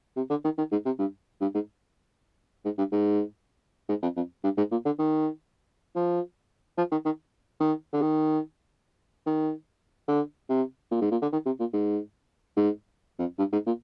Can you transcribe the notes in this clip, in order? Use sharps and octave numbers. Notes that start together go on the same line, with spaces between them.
C3
D3
D#3
D#3
G#2
C3
G2
G2
G#2
G#2
G2
G#2
G#2
F2
F2
G2
G#2
A#2
D3
D#3
F3
F3
D#3
D#3
D#3
D3
D#3
D#3
D3
C3
A#2
G#2
A#2
D3
D#3
C3
A#2
G#2
G#2
F2
G2
G#2
A#2